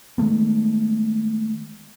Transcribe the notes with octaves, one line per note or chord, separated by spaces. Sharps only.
D#3 G#3 A3 B3